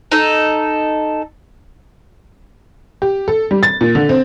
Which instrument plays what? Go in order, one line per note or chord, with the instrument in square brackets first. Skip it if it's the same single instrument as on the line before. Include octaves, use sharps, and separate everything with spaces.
[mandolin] D#4 A4
[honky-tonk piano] G4
A4
G3
A6
A#2
D3
C4